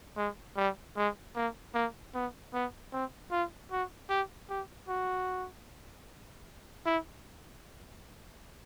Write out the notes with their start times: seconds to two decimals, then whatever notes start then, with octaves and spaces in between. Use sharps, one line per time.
0.17 G#3
0.57 G3
0.96 G#3
1.35 A#3
1.74 A#3
2.14 B3
2.54 B3
2.92 C4
3.31 F4
3.71 F#4
4.09 G4
4.50 G4
4.88 F#4
6.86 E4